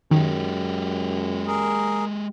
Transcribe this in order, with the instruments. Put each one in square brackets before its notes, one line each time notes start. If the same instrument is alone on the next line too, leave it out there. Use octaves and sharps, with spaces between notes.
[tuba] F#2 [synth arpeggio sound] D#3 [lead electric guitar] G#3 G4
[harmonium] G#4 A#4